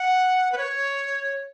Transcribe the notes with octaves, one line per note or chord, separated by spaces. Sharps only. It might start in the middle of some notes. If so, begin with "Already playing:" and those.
Already playing: F#5
B4
C#5